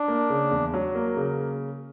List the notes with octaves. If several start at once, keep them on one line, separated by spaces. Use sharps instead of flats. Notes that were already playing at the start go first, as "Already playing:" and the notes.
Already playing: D4
A#3
C#3
E2
F#3
A#3
C#3